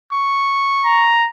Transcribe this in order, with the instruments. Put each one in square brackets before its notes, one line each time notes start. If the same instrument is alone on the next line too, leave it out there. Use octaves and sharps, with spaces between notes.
[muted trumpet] C#6
[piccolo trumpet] A#5